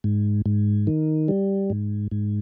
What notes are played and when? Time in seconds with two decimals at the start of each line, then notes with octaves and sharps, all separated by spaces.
0.04 G#2
0.46 G#2
0.87 D#3
1.28 G3
1.70 G#2
2.11 G#2